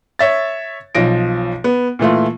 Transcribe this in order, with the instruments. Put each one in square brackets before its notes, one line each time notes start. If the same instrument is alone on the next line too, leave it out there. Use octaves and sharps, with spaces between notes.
[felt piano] C#5 E5 A6
B1 F3 A#6 D7
B3
A#2 E3 A3 F4